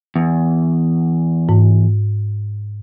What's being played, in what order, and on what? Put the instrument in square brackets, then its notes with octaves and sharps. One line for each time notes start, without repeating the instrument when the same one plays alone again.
[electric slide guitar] E2
[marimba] G#2